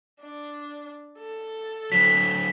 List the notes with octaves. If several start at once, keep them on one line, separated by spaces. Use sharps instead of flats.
D4
A4
D3 F#3 B6